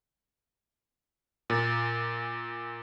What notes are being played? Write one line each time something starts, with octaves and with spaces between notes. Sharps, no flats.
A#2